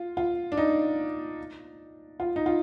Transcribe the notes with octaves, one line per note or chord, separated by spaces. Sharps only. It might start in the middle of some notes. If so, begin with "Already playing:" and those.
Already playing: F4
F4
D4
D#4
F4
D#4
F4